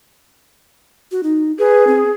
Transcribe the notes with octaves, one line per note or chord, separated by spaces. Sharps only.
F#4
D#4
G#4 B4
C4